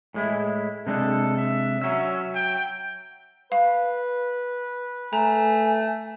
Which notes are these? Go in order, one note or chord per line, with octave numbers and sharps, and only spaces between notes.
A2 G#3 E4
C3 G#3 D4 A4
E5
F#3 C#4 E5
G5
B4 F5
A3 G#5 A#5